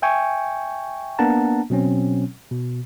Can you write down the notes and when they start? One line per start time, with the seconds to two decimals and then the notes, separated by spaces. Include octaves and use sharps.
0.02 E5 G5 G#5 C#6
1.19 A#3 B3 D4 F#5 A5 A#5
1.70 B2 F#3 C4 C#4
2.51 B2